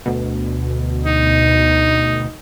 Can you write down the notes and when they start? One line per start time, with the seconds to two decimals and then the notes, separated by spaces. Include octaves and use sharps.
0.06 D2 B2
1.06 D#4